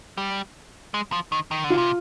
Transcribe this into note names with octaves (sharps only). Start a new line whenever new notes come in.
G3
G#3
F3
D#3
D#3
D3
F4
C3